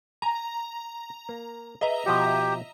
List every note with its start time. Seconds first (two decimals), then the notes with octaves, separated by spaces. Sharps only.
0.22 G#5 A#5
1.29 A#3
1.81 G#4 B4 D#5 E5 A#5
2.06 B2 F3 F#4 G4